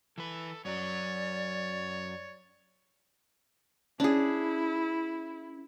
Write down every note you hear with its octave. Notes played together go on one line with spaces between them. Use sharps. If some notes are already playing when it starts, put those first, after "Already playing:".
E3 A4 B4
F#2 F#3 C#5 D5
C#4 D4 E4 G#4